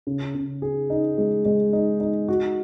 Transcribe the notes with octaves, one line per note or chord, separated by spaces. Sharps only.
C#3
C#3
G#4
D#4
G#3
G#3
D#4
D#4
F#4